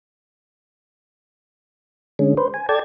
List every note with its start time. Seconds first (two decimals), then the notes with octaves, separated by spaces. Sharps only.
2.19 D3 G#3 C#4
2.37 B4 C5
2.54 G#5
2.69 A4 D5 G5 A5 G#6